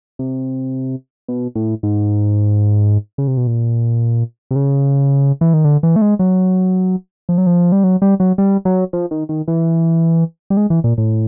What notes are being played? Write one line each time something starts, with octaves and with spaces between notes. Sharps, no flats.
C3
B2
A2
G#2
C#3
C3
B2
A#2
C3
C#3
E3
D#3
D3
E3
A3
G#3
F#3
F3
F#3
F3
G3
F#3
G3
F#3
G3
F#3
F3
D#3
D#3
E3
G3
G#3
E3
A#2
A2